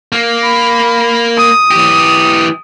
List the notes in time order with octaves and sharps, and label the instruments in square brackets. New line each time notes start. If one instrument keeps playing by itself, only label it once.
[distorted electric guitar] A#3
[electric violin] B5
D#6
[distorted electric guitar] E3 G4